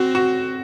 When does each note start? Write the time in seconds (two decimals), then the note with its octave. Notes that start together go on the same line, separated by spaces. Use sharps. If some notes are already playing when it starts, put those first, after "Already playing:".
Already playing: C4 F#4
0.15 F#4